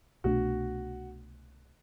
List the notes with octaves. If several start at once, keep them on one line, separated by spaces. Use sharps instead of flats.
C2 B2 A3 D4 F#4